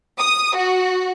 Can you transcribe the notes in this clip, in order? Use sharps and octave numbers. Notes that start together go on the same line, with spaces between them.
D#6
F#4